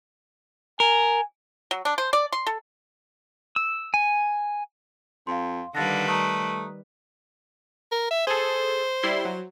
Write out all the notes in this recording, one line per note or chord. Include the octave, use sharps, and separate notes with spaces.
A#4 G#5
F#3
D4
C5
D5
C6
A4
E6
G#5
F2 F5 C6
D3 D#3 G3 B4 F5 A6 A#6
A3 A#5 D#6 F#6
A#4
E5
G#4 A4 C5
G3 E4 C6
F#3